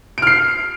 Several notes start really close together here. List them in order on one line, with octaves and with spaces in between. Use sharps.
D7 F6 C7